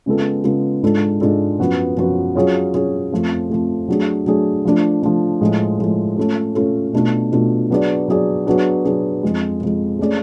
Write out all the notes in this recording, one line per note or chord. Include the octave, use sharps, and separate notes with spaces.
C#3 G#3 B3 F4 A4
C#3 G#3 B3 F4 A4
G#2 G#3 D4 F4 A4
G#2 G#3 D4 F4 A4
F#2 F3 B3 F#4 B4
F#2 F3 B3 F#4 B4
F#3 C#4 F4 G#4 C#5
F#3 C#4 F4 G#4 C#5
F2 F3 A3
F2 F3 A3
F#3 A3 D4 G#4
F#3 A3 D4 G#4
F3 A3 D4
F3 A3 D4
A2 F3 G#3
A2 F3 G#3
A3 C#4 F4 A4
A3 C#4 F4 A4
B2 A3 D4 F4
B2 A3 D4 F4
F#3 B3 D4 G#4 D5
F#3 B3 D4 G#4 D5
F#3 B3 D4 G#4
F#3 B3 D4 G#4
F2 F3 G#3
F2 F3 G#3
A3 C#4 G#4 D5